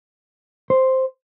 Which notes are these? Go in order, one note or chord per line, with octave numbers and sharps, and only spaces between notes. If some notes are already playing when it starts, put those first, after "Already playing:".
C5